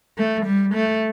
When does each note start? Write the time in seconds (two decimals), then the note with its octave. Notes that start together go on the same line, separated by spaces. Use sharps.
0.18 A3
0.46 G3
0.74 A3